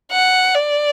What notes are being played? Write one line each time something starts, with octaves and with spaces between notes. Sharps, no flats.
F#5
D5